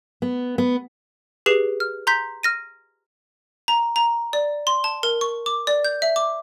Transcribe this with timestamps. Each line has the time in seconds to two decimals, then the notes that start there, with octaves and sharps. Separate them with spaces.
0.22 B3
0.58 B3
1.46 G4 G#4 B4 C7 E7
1.80 F6
2.07 A#5 C6 G6 B6
2.43 F6 A#6 D#7
3.68 A#5
3.96 A#5
4.33 D5
4.67 C6
4.84 A5
5.03 A#4
5.21 C#6
5.46 D6
5.67 D5
5.84 G6
6.02 E5
6.16 D6